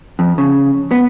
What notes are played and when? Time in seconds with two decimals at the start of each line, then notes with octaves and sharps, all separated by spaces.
0.19 F2
0.38 C#3
0.91 B3